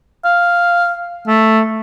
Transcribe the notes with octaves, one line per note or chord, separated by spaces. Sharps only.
F5
A3